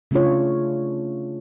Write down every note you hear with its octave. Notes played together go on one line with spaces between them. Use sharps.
C#3 A3 C#4 D4 F4 C#5